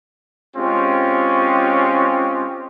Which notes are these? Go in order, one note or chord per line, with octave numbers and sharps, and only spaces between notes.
G#3 C4 C#4 F4 G4